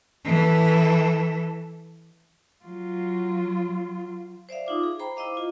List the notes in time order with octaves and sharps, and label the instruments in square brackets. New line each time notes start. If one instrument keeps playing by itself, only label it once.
[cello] E3 A4
F#3 F4
[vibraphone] C5 D5 E5 F5
D#4 F4 D6
G#4
C5 G5 A#5 B5
E4 C5 D#5 F5 D6
F4